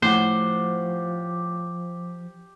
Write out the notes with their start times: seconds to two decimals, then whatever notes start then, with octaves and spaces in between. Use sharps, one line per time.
0.02 A2 F3 G4 C5 F#5